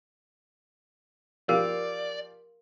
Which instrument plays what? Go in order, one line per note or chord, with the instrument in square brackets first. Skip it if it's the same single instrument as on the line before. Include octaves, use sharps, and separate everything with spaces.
[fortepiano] F3 G4 F5 [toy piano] A#4 [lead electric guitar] D5